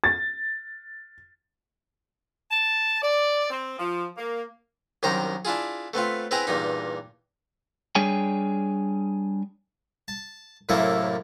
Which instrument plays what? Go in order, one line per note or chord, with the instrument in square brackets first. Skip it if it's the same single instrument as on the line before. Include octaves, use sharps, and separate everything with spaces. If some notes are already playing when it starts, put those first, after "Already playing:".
[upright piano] A6
[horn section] A5
D5
C4
F3
A#3
[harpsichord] C2 F#2 D#3 C5 G5 A#5
D4 E4 F4 G#4
A3 B3 C4 F4
B3 C4 E4 G#4 G5 A#5
E2 G2 A#2 D#4
[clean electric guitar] G3 D4 G#4 C#5 G5 G#5
[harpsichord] A5
F#2 A2 C3 A#3 E4 A4